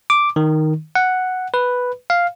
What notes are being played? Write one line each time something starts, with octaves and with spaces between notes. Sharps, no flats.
D6
D#3
F#5
B4
F5